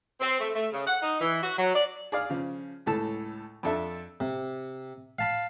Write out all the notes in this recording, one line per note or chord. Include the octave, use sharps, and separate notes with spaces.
C4
A3
A3
C#3
F#5
D#4
E3
F#4
F#3
D5
G#4 D5 F5
C#3 F3
C#2 A2 A4 A5
F2 D4 A4 E5
C3
F5 A5 B5